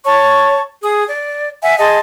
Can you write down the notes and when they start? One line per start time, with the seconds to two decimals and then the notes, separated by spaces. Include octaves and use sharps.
0.04 C#5 A5 C#6
0.83 G#4 D#6
1.09 D5
1.62 E5 F#5 G#5
1.78 G#4 D#5 A5 C6